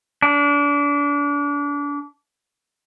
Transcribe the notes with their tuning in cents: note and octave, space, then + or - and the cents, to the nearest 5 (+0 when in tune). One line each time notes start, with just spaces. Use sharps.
D4 -30